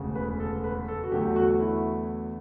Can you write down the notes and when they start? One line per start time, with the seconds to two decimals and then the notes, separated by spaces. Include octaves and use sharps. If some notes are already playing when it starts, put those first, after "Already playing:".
Already playing: E1 D2 C#3
0.15 B4
0.40 A4
0.64 B4
0.88 A4
1.03 F#4
1.12 E2 D3 F#3 A3 G4
1.36 F#4
1.60 E4